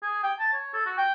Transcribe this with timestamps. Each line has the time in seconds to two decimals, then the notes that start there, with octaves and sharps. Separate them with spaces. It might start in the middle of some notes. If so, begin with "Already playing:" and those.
0.03 G#4
0.24 G5
0.40 A5
0.53 C#5
0.74 A4
0.86 F#4
0.98 G5